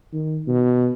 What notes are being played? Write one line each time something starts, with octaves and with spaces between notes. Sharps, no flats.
D#3
B2